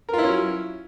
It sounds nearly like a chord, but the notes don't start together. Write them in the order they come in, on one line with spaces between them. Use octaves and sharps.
A#4 F4 E4 C#4 F#3